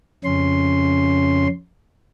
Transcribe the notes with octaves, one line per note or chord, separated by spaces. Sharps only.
F2 C#3 C#4 C6